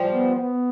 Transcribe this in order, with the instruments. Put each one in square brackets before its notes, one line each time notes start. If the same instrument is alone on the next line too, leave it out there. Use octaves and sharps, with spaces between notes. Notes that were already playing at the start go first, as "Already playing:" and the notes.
Already playing: [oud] F3 G3
[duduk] B3
B3